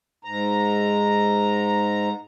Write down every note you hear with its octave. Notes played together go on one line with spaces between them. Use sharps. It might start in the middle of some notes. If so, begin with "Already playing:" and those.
G#2 A#5